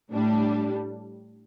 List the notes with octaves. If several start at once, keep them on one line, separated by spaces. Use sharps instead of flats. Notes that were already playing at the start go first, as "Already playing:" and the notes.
A2 G3 D4